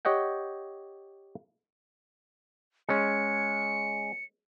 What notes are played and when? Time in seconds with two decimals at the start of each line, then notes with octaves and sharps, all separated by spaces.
0.05 G4 C#5 D#5 F#5 G5
2.89 G#3 C#4 C#7